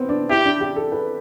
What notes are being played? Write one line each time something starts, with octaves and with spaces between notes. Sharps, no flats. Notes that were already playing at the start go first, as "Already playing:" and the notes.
Already playing: B3 C4
D4
E4 G4
D4
G4
A4
B4